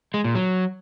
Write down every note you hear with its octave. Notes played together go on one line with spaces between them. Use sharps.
G#3
A#2
F#3